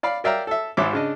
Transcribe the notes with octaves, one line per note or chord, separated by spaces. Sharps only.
D5 F5 B5
A#4 D5 E5 F5 G5 A#5
A4 E5
G#1 G#2 E5 D6
C#3 D4 D#5